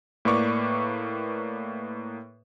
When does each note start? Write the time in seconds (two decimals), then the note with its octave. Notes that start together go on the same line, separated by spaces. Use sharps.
0.25 A2 A#3 B4 D5 C#6 D6